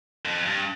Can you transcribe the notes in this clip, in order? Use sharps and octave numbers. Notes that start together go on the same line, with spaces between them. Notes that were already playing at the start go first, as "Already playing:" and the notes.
F2
G2